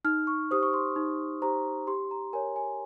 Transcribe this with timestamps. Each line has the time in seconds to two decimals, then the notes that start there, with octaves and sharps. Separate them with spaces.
0.05 D#4 F6
0.27 C#6
0.51 G4 C5 D#6
0.63 C#6
0.74 C6
0.96 D#4
1.42 G4 C5 A#5
1.87 G4 C6
2.11 A#5
2.33 A#4 C#5 G#5
2.56 G#5